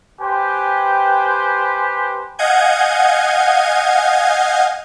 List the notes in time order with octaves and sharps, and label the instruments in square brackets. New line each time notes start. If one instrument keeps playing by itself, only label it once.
[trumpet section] G4 B4 C5 G5 G#5
[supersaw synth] D#5 F5 F#5 G#5 G6 G#6